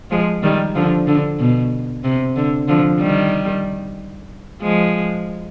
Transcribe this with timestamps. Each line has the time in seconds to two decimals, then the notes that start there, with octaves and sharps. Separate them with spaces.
0.10 F3 G#3
0.43 D#3 G3
0.75 D3 F3
1.08 D3
1.40 B2
2.04 C3
2.36 D3
2.68 D3 F3
3.00 D#3 G3
4.62 F3 G#3